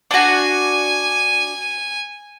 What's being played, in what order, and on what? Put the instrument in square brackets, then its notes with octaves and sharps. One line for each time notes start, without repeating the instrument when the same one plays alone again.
[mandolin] D4 F#4 [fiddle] G#5